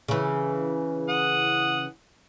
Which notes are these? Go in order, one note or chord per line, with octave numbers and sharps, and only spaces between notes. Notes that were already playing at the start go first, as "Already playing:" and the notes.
C#3 E3
F#5 D#6